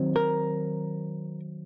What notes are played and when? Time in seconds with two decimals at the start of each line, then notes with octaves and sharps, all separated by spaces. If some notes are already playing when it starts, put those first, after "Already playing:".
Already playing: D#3 F#3 C4
0.16 A#4